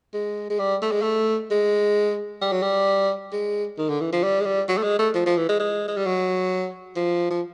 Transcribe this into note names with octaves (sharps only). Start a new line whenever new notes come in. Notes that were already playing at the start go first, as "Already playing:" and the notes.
G#3
G#3
G3
A3
G#3
A3
G#3
G3
F#3
G3
G#3
D#3
D3
E3
F3
G3
G#3
G3
F#3
A3
G#3
A3
F3
F3
E3
G#3
G#3
G#3
G3
F#3
F3
F3